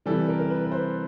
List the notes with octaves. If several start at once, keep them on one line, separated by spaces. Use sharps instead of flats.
C3 E3 G3 A4
A#4
A#4
B4
B4
C5